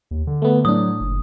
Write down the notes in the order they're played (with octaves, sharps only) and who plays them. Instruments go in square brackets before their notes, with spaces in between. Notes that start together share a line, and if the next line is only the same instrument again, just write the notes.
[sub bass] D#2
D3
[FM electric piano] A3 B3
[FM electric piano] A2 D4 [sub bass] F#3 [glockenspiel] D#6
[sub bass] F#1